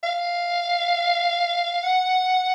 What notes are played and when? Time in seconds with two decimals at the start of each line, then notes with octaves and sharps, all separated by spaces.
0.04 F5
1.83 F#5